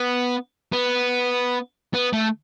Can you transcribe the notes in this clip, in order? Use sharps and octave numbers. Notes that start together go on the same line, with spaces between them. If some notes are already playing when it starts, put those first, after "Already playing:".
Already playing: B3
B3
B3
A3